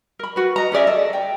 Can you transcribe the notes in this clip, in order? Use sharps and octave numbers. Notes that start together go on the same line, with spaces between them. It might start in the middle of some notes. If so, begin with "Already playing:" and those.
A#4 B5
F#4 B4
D#5 A#5
C#4 G#4 D5 E5
A4 D#5
G5